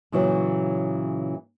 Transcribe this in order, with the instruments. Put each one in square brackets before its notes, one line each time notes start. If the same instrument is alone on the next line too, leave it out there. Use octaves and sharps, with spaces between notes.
[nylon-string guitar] A#2 C#3 E3 F#3